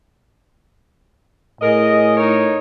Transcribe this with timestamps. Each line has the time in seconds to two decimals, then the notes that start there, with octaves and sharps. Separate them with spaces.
1.61 A2 G#4 A#4 D#5
2.17 D#4 A#4 C#5